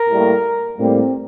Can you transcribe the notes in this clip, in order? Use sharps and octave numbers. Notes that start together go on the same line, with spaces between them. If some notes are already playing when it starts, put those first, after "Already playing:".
Already playing: A#4
A2 G3 A#3
A2 G3 A#3 C4